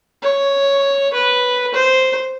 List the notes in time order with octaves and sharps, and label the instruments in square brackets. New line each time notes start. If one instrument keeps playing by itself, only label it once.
[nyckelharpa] C#5
B4
C5